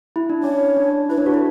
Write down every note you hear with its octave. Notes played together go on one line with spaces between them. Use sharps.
E4
D4
C#4 C#5
D4
E4 B4
D4 C#5
F#4 B4
E4 A4